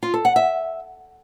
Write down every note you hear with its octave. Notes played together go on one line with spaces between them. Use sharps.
F4
A4
F#5
E5